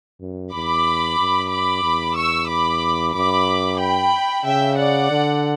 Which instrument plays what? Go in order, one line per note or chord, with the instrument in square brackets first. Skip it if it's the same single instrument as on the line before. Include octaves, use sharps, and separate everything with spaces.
[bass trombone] F#2
[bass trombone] E2 [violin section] B5 D6
[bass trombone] F#2
[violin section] B5 D6
[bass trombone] E2
[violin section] C#6 E6
B5 D6
[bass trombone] F#2 [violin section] B5 D6
[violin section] G5 B5
[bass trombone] C#3 [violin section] E5 G5
[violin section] D5 F#5
[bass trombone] D3